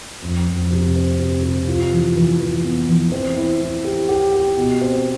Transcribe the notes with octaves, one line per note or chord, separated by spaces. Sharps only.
F2
F2
C3
C4
C3
C3
F4
E3
E3
E3
B3
E3
C4
E4
E4
G4
G4
G4
B2
C4